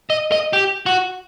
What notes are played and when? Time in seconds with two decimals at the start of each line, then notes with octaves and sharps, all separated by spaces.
0.10 D#5
0.32 D#5
0.53 G4
0.86 F#4